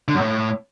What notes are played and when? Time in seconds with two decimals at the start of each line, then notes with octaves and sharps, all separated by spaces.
0.08 D3
0.14 F#2
0.20 A2